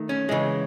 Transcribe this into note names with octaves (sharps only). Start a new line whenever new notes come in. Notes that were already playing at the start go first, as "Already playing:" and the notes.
Already playing: D#3 A3
C#4
C#3 E3 G#3